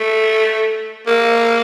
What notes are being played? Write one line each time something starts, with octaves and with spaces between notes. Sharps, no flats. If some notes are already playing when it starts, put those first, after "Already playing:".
Already playing: A3
A#3